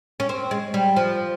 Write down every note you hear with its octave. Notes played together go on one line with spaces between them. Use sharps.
C#4
C4
G#3
G3
F3